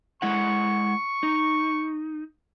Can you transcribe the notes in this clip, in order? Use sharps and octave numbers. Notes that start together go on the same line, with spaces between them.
G#3 E4 F#5 C#6
D#4